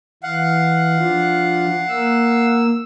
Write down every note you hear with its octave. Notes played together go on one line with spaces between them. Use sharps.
E3 F5 F#5
F3 D4 F4
A#3 E6